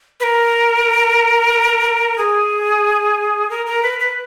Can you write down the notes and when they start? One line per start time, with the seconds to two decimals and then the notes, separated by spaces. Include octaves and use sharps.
0.20 B4
0.23 A#4
2.18 G#4
3.50 A#4
3.66 A#4
3.83 B4
4.00 B4